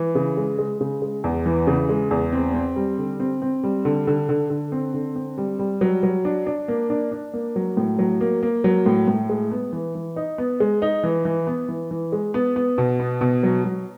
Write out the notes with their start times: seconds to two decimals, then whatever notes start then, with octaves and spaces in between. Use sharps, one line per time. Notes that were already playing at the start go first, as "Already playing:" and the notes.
Already playing: E3
0.15 C#3
0.37 G#3
0.59 G#3
0.81 C#3
1.02 G#3
1.24 E2
1.46 E3
1.67 C#3
1.89 G#3
2.11 E2
2.33 C4
2.55 C4
2.76 G3
2.98 D3
3.20 C4
3.42 C4
3.63 G3
3.85 D3
4.07 D3
4.29 D3
4.50 D3
4.72 C4
4.94 D3
5.16 C4
5.37 G3
5.59 G3
5.81 F#3
6.03 F#3
6.25 D4
6.47 D4
6.68 A#3
6.90 D4
7.12 D4
7.34 A#3
7.56 F#3
7.77 A2
7.99 F#3
8.21 A#3
8.43 A#3
8.64 F#3
8.86 A2
9.08 A2
9.29 G#3
9.52 B3
9.73 E3
9.95 E3
10.16 D#4
10.38 B3
10.60 G#3
10.82 D#4
11.04 E3
11.25 E3
11.47 B3
11.69 E3
11.91 E3
12.12 G#3
12.34 B3
12.56 B3
12.78 B2
13.00 B3
13.21 B2
13.43 F#3
13.64 F#3